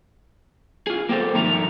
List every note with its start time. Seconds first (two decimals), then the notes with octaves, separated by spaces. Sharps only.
0.87 F4 G#4
1.09 A#3 C4 G4 A4 C5
1.35 G2 D#3 F3 A3 A#4 A#5